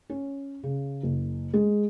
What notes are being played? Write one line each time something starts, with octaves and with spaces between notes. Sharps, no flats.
C#4
C#3
F#1
G#3